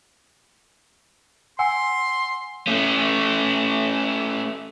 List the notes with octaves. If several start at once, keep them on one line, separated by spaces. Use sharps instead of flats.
F#5 G#5 C6 E6
A3 C#4